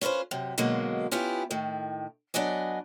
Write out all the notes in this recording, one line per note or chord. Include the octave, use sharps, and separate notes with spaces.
C#4 F4 A4 B4 C5
F#2 C3
B2 D3 F#3 G#3 A#3
B3 C#4 E4 F4 G4
A2 D#3
F#3 B3 D4 D#5 G#5